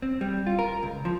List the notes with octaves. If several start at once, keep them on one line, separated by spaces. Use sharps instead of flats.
C4
G3
F4
A#4
C#2
F3